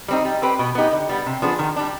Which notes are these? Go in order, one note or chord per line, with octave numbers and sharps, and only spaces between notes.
G3 C4 D#4
G3
C4 G4 B4
B2
B3 D#4 G4
D3
G3 B3
C3
F3 B3 D4 G#4
D#3
G3 D4